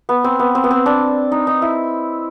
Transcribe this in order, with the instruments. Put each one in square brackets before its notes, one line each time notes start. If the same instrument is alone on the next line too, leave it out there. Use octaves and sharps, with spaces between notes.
[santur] B3
C4
B3
C4
B3
C4
D4
D#4
D#4
E4